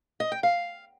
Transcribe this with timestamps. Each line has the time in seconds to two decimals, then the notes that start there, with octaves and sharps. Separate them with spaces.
0.20 D#5
0.32 G5
0.43 F5